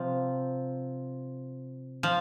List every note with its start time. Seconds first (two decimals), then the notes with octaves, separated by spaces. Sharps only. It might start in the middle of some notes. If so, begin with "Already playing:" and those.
Already playing: C3 F3
2.03 F3